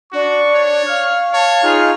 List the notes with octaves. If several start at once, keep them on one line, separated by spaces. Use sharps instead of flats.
D4 F#4 C#6
C#5
F5 F6
C#5 A5
D#4 F4 G#4 F6